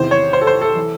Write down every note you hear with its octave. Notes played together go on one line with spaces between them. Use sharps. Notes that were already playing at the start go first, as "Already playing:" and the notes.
Already playing: E2 C3 D#3 C5
C#5
C5
A4
C5
A4
E3